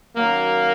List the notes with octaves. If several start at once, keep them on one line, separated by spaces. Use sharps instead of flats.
F#2 D#3 F#3 A#3